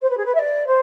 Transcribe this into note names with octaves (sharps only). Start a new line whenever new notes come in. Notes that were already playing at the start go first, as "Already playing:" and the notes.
C5
B4
G#4
B4
E5
D5
C5